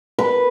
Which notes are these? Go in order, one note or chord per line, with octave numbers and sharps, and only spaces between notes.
B4